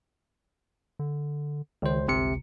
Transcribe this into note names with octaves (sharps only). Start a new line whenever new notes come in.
D3
C#2 D#3 C5
G1 C#2 C3 C#7